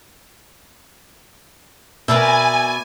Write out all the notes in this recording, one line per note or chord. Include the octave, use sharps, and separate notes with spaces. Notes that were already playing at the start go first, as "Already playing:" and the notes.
B2 A#4 D5 E5 G#5